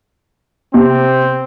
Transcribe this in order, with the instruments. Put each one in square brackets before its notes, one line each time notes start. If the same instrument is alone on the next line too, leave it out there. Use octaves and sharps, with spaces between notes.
[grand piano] C3 [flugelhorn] C4